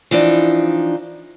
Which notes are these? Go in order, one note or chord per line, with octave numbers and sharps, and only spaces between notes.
E3 F3 D4 D#4